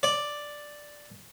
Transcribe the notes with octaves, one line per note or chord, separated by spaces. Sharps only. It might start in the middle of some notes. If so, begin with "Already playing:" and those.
D5